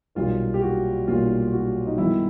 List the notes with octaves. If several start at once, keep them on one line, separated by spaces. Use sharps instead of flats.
B1 A#2 G3 A#3 F4
G4
F#4
B1 A#2 G3 A#3 F4
F#4
D#4
G2 D#3 G#3 B3 E4